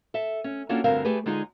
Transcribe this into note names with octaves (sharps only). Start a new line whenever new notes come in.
A4 E5
C#4
A#3 C#4 D4 F4 F#4 A4
D2 G2 D3 C4 A#4 F5
A3 G4 G#4 B4
D3 G#3 D#4 F4 G#4